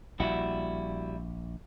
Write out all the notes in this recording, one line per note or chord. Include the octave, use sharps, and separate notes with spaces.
A#1 G3 E4 F#4